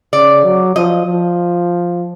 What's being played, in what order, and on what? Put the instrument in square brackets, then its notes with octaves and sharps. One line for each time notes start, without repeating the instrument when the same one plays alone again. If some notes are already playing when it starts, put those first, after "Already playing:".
[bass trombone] C#3 [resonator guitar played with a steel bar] D5
[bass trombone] F#3
[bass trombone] F3 [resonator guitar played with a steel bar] D#5
[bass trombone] F3